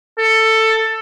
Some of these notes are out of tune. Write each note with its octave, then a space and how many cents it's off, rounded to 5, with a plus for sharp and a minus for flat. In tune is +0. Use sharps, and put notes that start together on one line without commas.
A4 +15